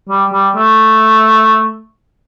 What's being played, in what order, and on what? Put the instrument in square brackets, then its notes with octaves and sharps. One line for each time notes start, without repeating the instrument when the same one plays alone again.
[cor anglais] G3
G3
A3